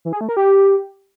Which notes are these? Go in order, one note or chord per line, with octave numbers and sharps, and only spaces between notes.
E3
G#4
A3
A#4
G4